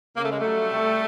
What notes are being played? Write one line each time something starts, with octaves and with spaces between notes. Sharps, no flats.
C#3 A#3
A3
G#3
F#3 G3 A3
C3